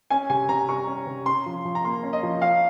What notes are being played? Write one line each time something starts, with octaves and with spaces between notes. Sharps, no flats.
C#4 G#5
C3 G#5
C3 A#5
G3 C#6
C#4
C3
C#4 C6
F3
F3
A#5
A#3 C6
C#4
D#5
F3
C#4 F5